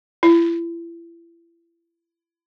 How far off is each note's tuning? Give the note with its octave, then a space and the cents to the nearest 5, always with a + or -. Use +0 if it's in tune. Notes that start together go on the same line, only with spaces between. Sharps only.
E4 +35